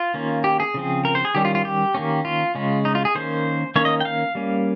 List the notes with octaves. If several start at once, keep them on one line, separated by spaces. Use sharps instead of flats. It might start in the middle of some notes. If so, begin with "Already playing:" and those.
Already playing: F4
D#3 A#3 C#4
G4
G#4
C#3 F3 C4
A#4
C5
G#4
D#3 G3 C#4 G4
F4
F4
G4
D#3 A#3 C#4
F4
C#3 G#3 C#4
D#4
F4
G#4
D#3 A#3 C#4 C5
D#3 A#3 C#4 C#5
D#5
G5
F5
G3 A#3 C#4